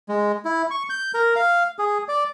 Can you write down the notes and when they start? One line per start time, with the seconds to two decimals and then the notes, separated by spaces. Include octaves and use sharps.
0.09 G#3
0.45 E4
0.71 C#6
0.90 G6
1.14 A#4
1.36 F5
1.79 G#4
2.08 D5